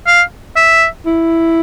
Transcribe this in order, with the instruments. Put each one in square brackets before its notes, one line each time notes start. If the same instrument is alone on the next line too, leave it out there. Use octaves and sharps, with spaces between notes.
[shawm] F5
E5
[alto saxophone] E4